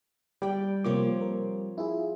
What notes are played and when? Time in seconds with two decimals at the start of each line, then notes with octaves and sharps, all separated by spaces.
0.42 G3 D5 G5
0.84 C3 F3 A#3 C4 C#5 D6
1.21 A#4
1.78 E4 F4 G#4